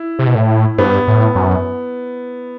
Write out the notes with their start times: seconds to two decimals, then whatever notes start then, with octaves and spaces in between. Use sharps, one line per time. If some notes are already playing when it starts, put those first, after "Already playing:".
Already playing: E4
0.19 C3
0.27 B2
0.35 A2
0.78 G2 B3
1.07 A2
1.35 F#2